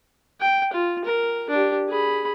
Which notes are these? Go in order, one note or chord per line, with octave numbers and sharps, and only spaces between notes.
G5
F4
A#4
D4 G4
G#4 B5